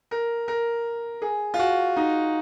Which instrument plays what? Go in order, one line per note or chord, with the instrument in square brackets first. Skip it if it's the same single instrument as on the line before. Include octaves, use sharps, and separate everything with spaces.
[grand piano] A#4
A#4
G#4
F4
F#4
D#4